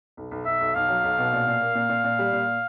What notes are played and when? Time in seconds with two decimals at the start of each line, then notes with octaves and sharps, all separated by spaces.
0.17 B1
0.31 B1
0.46 B1 E5
0.61 B1
0.75 B1 F5
0.89 F#3
1.03 B1
1.18 B2
1.33 A#2
1.47 A#2
1.61 A#3
1.75 A#2
1.90 A#2
2.04 A#2
2.19 G3
2.33 A#2